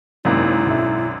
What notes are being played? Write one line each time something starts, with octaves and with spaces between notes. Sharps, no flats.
G#1 F#2 C3 A#3 D#4 E4
B1 E5